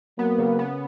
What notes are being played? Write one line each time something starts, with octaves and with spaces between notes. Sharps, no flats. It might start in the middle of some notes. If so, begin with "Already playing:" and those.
F#3 A#3 B3
C#3
B3